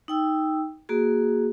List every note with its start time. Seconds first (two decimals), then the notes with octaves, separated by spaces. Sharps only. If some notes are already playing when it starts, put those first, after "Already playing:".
0.08 D#4 G5 E6
0.89 A#3 F#4 G#4